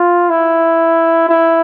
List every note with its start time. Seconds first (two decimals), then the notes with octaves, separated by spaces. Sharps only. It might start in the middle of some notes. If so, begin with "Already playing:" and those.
Already playing: F4
0.29 E4
1.29 E4